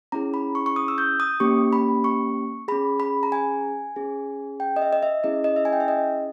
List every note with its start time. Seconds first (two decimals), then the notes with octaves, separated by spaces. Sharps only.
0.12 C#4 E4 G#4 A#5
0.34 B5
0.55 C#6
0.66 C#6
0.76 D#6
0.88 E6
0.98 G6
1.20 D#6
1.40 A#3 C#4 G4 C#6
1.73 B5
2.04 C#6
2.68 C#4 G#4 B5
3.00 B5
3.23 A#5
3.32 G#5
3.96 C#4 G#4
4.60 G5
4.76 D#5
4.82 E5
4.93 D#5
5.03 E5
5.24 C#4 E4 G#4 D#5
5.44 D#5
5.56 E5
5.65 G#5
5.73 G5
5.80 E5
5.88 D#5